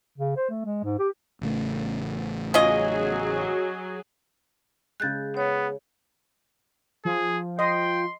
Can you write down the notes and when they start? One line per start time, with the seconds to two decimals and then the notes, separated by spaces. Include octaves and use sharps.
0.18 C#3
0.37 C5
0.49 A3
0.65 G#3
0.84 G#2
0.99 G4
1.42 A1 C#3 A3
2.54 F#3 C#4 F4 G#4 D#5
5.00 C#3 G#3 F#6 G6 A6
5.37 B3 C#5
7.05 F3 G#4
7.59 D#5 G5 C6